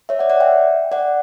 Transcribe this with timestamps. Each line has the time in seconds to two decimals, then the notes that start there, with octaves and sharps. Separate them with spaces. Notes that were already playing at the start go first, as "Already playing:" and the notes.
0.09 C#5 E5
0.19 D5 F#5
0.30 D5 F#5
0.40 E5 G5
0.92 D5 F#5